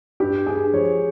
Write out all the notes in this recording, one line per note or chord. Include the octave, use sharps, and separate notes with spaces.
G2 G4
G2 G#4
F3 C#5